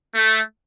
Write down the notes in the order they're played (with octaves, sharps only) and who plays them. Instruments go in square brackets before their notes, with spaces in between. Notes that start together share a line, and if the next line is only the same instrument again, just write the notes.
[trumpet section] A3